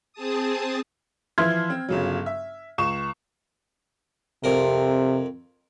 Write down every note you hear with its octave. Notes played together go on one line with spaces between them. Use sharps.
C4 G#4 A5 D#6
E3 F3 E5 C6 F6 G#6
C4
G1 C#3 F#3
E5
C#2 C#6 E7
F2 C3 A#4